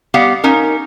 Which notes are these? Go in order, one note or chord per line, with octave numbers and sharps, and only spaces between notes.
G3 B3 G4 F5 F#5
C#4 D#4 A#4